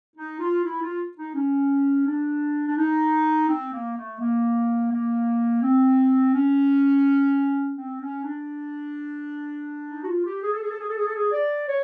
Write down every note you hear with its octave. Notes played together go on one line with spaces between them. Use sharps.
D#4
F4
E4
F4
D#4
C#4
D4
D4
D#4
C4
A#3
A3
A#3
A#3
C4
C#4
C4
C#4
D4
D#4
F#4
F4
G4
G#4
A4
G#4
A4
G#4
A4
G#4
A4
G#4
D5
C#5